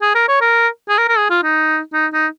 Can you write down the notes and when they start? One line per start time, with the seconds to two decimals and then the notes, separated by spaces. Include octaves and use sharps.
0.02 G#4
0.15 A#4
0.28 C#5
0.41 A#4
0.89 G#4
0.98 A#4
1.08 A#4
1.18 G#4
1.30 F4
1.43 D#4
1.93 D#4
2.13 D#4